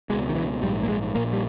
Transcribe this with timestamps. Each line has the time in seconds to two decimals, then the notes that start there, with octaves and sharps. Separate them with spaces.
0.10 B2 G#3
0.13 C#2
0.29 D#3
0.35 E3
0.62 A#1 G#2 G3
0.83 A#3
0.88 G#3
1.14 A#1 A#2 A#3
1.33 G3